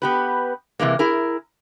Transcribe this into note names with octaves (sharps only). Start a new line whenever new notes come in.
B3 G4 B4
C3 E3 G#3 A#3
E4 G#4 A#4